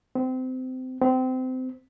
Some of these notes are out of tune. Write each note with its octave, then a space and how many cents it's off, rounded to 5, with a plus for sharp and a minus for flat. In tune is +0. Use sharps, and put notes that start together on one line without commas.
C4 -25
C4 -25